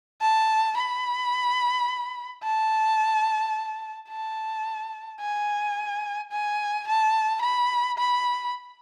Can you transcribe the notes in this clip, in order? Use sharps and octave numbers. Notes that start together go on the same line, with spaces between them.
A5
B5
A5
A5
G#5
G#5
A5
B5
B5